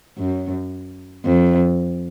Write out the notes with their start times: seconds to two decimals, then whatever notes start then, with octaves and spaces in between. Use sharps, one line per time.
0.18 F#2
1.25 F2